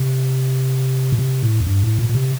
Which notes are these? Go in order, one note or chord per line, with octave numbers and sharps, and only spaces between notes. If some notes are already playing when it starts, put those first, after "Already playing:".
Already playing: C3
A#2
C3
A2
F2
G2
A2
A#2
A#2
C3